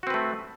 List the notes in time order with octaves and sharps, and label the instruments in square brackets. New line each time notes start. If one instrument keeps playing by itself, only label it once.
[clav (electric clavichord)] F#4
C4
B4
A3